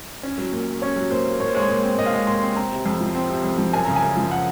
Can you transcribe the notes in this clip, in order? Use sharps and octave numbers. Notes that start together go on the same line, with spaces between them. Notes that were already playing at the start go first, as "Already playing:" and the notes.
C#4
F#3
A#2
A#3
C#4 C#5
F#3
A#2 C5
A#3
A#2 C#5
C5
G#3 C#5
A#2
C4
A#2 D#5
F5
G#3 D#5
A#2 C6
C4
C4 A#5
C3
F2
F3
C4
C3
F2
F3
F#2 G#5
C#3 A#5
G#5
F#2
F3
F#5